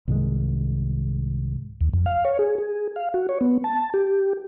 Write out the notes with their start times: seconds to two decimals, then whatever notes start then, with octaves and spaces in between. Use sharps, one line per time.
0.08 C2 G#2 D#3 G#3
1.81 D#2
1.93 F2
2.06 F5
2.25 C#5
2.39 G#4
2.58 G#4
2.96 F5
3.14 F#4
3.29 C#5
3.41 B3
3.64 A5
3.94 G4